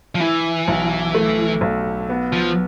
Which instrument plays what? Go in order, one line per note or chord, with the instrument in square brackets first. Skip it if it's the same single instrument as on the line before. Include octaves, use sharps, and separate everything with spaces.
[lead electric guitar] F3
[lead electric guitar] E3 [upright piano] E4
[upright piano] B1
A3
B1
B3
[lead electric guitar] F3